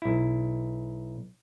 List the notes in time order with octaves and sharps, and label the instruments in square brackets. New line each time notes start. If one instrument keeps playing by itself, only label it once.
[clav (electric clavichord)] B1 E4